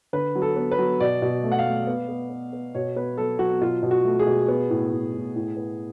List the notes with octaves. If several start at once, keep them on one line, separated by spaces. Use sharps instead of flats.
D3 B4
F#3
A4
B3
B4
F#3
B2 D5
B2
A3
F#5
F5
A3
B3
B3
B3
B3
B2 C#5
B3 B4
F#3 A4
F#3 F#4
B2 F4
B2
F#4
A3
G#4
B2
B3
A2
A2
A2
A2
B3